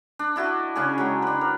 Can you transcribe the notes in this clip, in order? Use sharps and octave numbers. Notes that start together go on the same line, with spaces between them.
D4
D4 E4 F#4 D#5
C#3 C#4 D4 G#4
F#3 G#3 G5
D4 B4
A#4